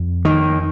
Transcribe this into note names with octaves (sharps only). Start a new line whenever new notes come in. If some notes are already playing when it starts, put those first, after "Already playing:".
Already playing: F2
D#3